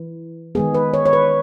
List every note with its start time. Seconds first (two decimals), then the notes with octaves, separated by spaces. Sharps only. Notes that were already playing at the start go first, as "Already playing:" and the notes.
Already playing: E3
0.55 D#3 G#3 B3 G#4
0.74 B4
0.94 C#5
1.06 C#5
1.13 B4